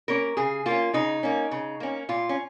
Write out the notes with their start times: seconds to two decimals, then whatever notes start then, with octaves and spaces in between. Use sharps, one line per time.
0.08 A#3 C#4 A#4
0.37 C#3 G#4
0.66 A#3 C#4 F4
0.93 C#3 D#4
1.23 A#3 C#4
1.51 C#3
1.80 A#3 C#4
2.09 A#2 F4
2.29 C#4